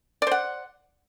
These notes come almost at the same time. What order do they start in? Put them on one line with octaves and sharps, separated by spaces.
D5 C5 F#5